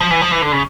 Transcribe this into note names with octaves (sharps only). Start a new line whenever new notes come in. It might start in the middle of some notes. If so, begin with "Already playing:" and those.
F3
E3
F3
E3
D3
C#3